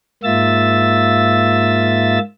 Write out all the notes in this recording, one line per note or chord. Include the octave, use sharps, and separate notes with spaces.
G#2 A#3 F4 E5 E6 A6